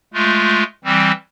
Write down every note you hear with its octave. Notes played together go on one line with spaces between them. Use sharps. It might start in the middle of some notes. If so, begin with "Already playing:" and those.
G#3 A3 F4
E3 G3 C4